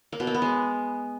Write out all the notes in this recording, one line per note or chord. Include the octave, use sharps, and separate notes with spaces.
A#3
B2
A#3
B3
G#3